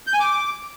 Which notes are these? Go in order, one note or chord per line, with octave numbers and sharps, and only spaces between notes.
G6
G#5
D6